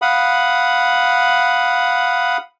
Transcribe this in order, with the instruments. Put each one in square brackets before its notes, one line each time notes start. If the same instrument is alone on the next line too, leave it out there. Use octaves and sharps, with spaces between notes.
[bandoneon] F5 F#5 B5 D#6